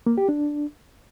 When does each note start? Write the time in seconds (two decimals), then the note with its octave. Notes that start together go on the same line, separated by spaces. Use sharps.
0.06 A#3
0.18 G4
0.29 D4